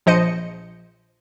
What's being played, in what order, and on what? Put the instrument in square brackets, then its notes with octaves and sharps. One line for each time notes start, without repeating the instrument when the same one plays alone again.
[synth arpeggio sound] A#1 F3 C5 D#5 C#7 D#7